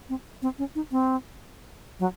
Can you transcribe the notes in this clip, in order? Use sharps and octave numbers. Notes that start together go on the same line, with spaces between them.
C4
C4
C#4
D#4
C4
F#3